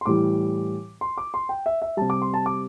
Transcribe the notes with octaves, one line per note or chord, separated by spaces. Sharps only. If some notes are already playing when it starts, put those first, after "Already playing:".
C6
A2 E3 G3 D6
C6
D6
C6
G5
E5
E5
C3 G3 A5
D6
C6
A5
D6